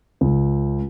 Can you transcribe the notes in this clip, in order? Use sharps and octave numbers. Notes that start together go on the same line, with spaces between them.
C#2